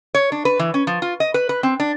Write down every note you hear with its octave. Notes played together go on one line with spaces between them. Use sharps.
C#5
D4
B4
E3
C#4
F3
F4
D#5
B4
B4
C4
D4